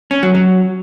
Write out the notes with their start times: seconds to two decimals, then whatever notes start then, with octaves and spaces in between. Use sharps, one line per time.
0.11 C#4
0.23 F#3
0.35 F#3